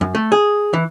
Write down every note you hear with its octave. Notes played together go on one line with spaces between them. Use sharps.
F#2
A3
G#4
E3